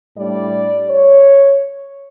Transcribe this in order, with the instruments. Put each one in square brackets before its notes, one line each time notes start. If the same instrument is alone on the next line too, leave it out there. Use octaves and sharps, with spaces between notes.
[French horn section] A2 G3 D4 D5
C#5